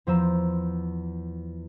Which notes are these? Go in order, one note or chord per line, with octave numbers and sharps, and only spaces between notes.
E2 F3 C5 A#5 E6 E7